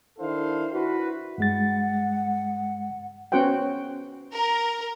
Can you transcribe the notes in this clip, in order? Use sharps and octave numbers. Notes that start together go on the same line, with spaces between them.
D#3 D4 E4 A4 C5 F5
E4 F#4 B4
G2 G#3 F#5 A6
B3 C#4 F#4 C5 F#5 G5
A#4